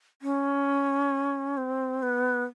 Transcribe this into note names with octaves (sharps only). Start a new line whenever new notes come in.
C#4
C4
B3